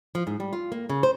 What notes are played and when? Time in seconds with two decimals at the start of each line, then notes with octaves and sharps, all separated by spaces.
0.15 F3
0.27 G#2
0.40 G3
0.53 F4
0.72 A#3
0.89 C#3
1.03 C5